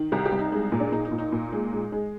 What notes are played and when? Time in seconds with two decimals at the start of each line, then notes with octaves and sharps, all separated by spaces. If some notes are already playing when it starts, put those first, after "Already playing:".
Already playing: D#3
0.12 C2 G4
0.26 G4
0.32 C2
0.39 D#4
0.52 G#3
0.72 A#2
0.80 D4
0.92 A#2 D#4
1.05 D#4
1.12 A#2
1.18 D#4
1.32 A#2
1.52 G#3
1.73 G#3
1.92 G#3